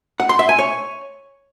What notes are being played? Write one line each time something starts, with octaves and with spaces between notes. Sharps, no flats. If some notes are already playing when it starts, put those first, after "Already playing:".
F#5
C6
E5
G#5
C#5